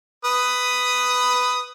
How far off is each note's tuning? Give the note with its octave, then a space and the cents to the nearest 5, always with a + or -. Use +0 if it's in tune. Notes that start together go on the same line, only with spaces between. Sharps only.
B4 +10 D#6 +0